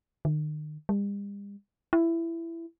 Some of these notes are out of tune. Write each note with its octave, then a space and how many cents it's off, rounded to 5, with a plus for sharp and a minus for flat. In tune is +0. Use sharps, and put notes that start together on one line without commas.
D#3 -40
G3 +45
E4 +15